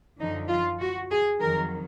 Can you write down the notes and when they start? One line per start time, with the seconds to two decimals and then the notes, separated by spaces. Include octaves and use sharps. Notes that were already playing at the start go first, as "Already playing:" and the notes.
0.19 F#2 D3 F3 D#4
0.49 F4
0.80 F#4
1.10 G#4
1.39 F2 D#3 F#3 A#4